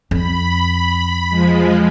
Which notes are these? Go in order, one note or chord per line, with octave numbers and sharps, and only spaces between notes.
F2 B5
F3 G#3